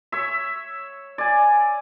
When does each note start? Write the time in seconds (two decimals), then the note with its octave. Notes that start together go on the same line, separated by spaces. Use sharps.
0.12 C#5 E5
1.18 D5 G#5